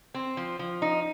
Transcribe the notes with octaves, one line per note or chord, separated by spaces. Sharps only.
C4
F3
F3
D#4